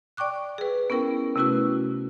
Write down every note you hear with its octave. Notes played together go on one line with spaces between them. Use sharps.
D5 G5 C#6 D6 F#6
G#4 B4
B3 C#4 E4 A#4 G5
C3 A3 C#4 E4 F#4 B4